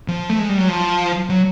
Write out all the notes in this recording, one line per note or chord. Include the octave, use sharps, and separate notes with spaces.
F3
A3
G#3
G3
F#3
F3
F#3